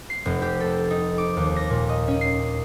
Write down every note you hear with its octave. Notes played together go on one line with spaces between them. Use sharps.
C7
F1
G4
A4
D#4
D6
D#2
A#6
A#2
D#5
C#4
C7